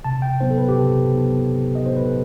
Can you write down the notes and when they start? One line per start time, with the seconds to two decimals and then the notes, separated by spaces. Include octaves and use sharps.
0.04 C3 A5
0.22 G5
0.40 F#3 B3 D#4 C5
0.50 A4
0.58 B4
0.69 G4
0.76 C3 A4
1.11 F#3 B3 D#4
1.46 C3
1.75 D#5
1.82 F#3 B3 D#4 C5
1.97 B4
2.07 A4